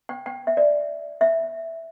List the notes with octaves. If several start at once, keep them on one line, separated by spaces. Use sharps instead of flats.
G5
G5
E5
D5
E5